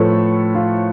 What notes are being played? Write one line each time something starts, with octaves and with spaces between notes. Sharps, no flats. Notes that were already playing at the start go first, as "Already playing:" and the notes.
Already playing: A2 F3 A3 A4 B4 C#5
F4